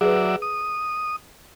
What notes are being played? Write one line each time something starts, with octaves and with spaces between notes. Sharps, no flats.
F#3 G#4 B4 D5 E5
D#6